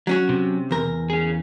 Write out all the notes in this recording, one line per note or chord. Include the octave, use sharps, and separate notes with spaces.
F#3 C#4 F#4
C3
E2 A#4
C#4 G#4